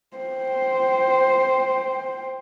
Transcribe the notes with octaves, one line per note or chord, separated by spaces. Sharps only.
C5 G5